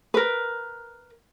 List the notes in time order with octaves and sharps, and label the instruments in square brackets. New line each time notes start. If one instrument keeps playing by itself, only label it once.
[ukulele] A#4 B4